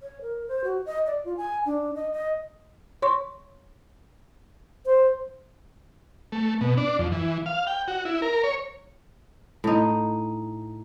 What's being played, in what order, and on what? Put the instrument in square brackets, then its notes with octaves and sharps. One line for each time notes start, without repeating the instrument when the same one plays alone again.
[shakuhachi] C#5
A#4
C5
F#4
D#5
D5
F4
G#5
D4
D#5
D#5
[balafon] C#5 C6 C#6
[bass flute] C5
[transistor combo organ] A3
B2
D4
F2
E3
F5
G5
F#4
E4
A#4
C#5
[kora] A2 D#4